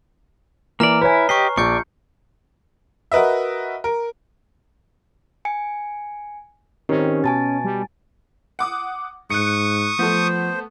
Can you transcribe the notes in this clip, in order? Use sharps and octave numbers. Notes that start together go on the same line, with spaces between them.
E3 A#3 D5 A#5 F6
E4 B4 C#5 G#5
G4 D#5 C#6 C7
A#1 D5 C#6 G6 C#7
F#4 A#4 B4 D#5 E5
A#4
G#5 C#7
D#3 C4 C#4 G4
B2 G#5 A5 A6
G3
F#5 D6 D#6
G#2 C#6 D#6 F#6 C#7
F3 A3 B3 C5